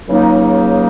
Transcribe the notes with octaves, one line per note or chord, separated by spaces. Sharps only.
C#2 C#3 F#3 A#3 D#4